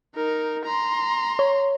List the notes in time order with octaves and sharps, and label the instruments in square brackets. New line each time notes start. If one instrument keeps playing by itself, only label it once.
[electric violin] D#4 A#4
A#5 C6
[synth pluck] C#5